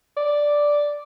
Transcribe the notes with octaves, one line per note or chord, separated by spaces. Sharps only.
D5